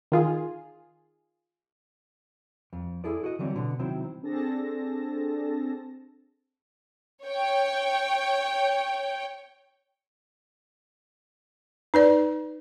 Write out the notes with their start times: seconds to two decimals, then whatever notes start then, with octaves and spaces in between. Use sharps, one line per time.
0.12 D#3 F4 G#4
2.73 F2
3.04 E4 G#4 A4 D5
3.24 F#4 D#5
3.39 D3 E3 F#3 G3 C4
3.56 B2 D3
3.79 C3 D#3 F#3 C4 E4
4.23 C4 D4 G#4 A4 A5 A#6
7.24 C#5 G5
11.94 D#4 B4 D5